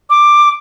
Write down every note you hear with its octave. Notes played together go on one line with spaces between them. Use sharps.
D6